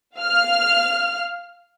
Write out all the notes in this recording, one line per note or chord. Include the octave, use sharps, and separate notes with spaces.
F5 F6